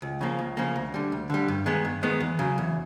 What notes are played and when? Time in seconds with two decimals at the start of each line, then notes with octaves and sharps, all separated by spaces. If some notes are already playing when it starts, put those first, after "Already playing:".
0.02 C#2
0.21 C#3 F3 A#3
0.39 C#2
0.57 C#3 F3 A#3
0.76 D2
0.94 D3 G3
1.12 D2
1.30 D3 G3
1.48 G2
1.66 D#3 G#3 B3
1.85 G2
2.03 D#3 G#3 B3
2.21 E2
2.39 C#3 F#3
2.58 E2